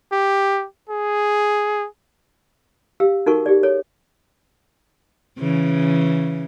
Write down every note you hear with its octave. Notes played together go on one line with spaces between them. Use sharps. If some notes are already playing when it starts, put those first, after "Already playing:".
G4
G#4
G4 F5 E6
D#4 F#4 A4 A#4 F#5 C#6
G4 G#4 D5
A4 C#5
C#3 E3